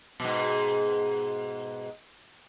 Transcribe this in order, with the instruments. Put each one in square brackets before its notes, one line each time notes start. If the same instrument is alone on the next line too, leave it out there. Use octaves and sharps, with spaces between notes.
[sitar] G#2 B2